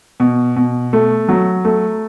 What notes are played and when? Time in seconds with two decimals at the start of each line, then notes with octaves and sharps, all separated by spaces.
0.20 B2
0.56 B2
0.93 A3
1.29 F#3
1.65 A3